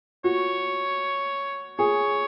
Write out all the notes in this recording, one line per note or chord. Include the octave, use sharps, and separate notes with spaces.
F#4 C#5
G#4 C#5